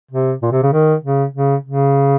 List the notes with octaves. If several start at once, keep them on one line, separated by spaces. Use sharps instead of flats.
C3
A#2
C3
C#3
D#3
C#3
C#3
C#3